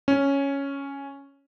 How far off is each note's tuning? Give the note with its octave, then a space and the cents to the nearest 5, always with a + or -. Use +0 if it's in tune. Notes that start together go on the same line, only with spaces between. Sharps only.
C#4 +0